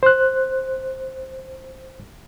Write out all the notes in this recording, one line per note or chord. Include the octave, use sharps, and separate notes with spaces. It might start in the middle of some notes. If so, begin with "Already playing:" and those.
C5 F#6